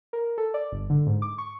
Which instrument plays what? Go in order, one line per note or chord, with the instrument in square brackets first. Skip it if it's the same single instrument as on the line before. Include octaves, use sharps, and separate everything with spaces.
[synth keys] A#4
A4
D5
G1
D3
G#2
D6
C#6